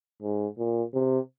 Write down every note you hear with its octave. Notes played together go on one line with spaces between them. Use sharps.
G#2
A#2
C3